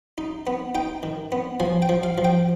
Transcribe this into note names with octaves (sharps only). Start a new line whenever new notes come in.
D#4
B3
D#4 G5
D#3
B3
F3 G#5
G5
F3
F5
F3
G5